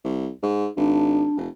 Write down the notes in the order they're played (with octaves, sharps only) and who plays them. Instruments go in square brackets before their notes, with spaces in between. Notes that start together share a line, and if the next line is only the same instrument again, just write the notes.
[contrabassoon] C2
G#2
[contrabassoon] G#1 [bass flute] D4
[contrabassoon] F1